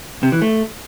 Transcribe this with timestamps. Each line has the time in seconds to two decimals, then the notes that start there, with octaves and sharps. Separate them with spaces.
0.23 C3
0.32 E3
0.42 A3